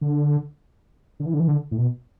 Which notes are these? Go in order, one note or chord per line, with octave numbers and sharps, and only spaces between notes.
D3
D3
E3
D3
E3
D3
A2
B2